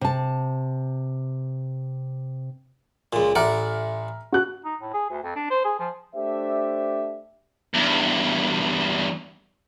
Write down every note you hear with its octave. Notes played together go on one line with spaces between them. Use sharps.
C3 A5
C#2 A#2
A1 D5 E5 F#5 A#5 F6
F#4 F#6
D#4
A2
G#4
D2
F2
D4
C5
G#4
F3
A3 D4 G4 C5 E5
E2 G2